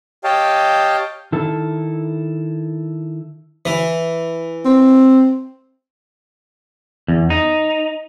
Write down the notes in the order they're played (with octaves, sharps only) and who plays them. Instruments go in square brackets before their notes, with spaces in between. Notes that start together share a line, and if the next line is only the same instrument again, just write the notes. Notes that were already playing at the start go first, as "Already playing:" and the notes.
[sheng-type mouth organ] G4 C#5 D#5 F5 G5 A5
[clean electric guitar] D#3 E4 A4
[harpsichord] E3
[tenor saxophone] C4
[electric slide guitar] E2
D#4